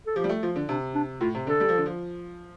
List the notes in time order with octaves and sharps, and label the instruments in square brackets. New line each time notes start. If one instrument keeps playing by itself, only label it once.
[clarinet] A4
[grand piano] F3 [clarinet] G4
[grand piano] G3
A3
[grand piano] F3 [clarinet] F4
[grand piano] D3
[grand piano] C3 [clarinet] D4
[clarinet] D4
[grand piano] A2 [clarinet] F4
[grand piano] C3
[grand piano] D3 [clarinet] A4
[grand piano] G3
F3
D3
F3